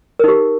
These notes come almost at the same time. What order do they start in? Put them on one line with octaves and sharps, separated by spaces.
A#4 D#4 G4